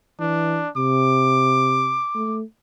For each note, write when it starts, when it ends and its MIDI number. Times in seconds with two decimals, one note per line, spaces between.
0.20 0.62 52
0.20 0.69 62
0.77 2.01 48
0.77 2.37 86
2.15 2.43 57